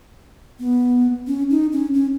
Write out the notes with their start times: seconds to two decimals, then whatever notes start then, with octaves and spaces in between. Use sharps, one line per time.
0.60 B3
1.27 C#4
1.50 D#4
1.72 C#4
1.94 C#4